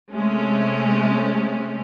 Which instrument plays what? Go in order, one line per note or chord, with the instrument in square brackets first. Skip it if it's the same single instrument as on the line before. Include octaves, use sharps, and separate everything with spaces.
[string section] C3 G#3 A3 C#4